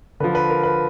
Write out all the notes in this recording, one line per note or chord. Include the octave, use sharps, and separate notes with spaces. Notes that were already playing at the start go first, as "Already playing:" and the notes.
D3 F3 B4
B4
A#4
B4